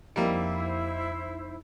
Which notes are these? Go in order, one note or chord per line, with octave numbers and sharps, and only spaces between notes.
F2 G3 A#3 D#4 E4 C5